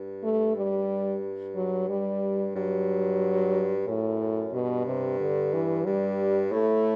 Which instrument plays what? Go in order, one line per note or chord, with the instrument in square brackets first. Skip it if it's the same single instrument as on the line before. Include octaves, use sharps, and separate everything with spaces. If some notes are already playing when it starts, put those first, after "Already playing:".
Already playing: [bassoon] G2
[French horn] A3
G3
F#3
G3
[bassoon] G2 [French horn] F#3
[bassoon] F#2 [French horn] A2
[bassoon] F#2
[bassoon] G2 [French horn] B2
[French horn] C3
D3
E3
[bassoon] G2 [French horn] G3
[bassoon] A2 [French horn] A3